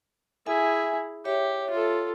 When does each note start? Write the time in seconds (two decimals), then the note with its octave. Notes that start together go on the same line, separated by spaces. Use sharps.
0.46 E4 G#4 E5 G#5
1.25 G4 C#5 E5
1.70 F4 A4